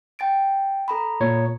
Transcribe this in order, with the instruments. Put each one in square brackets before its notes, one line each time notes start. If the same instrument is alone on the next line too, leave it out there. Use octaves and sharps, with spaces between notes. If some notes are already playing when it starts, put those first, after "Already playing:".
[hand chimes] G5 A6 D7
A4 A#5 B5
[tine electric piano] A#2 C#5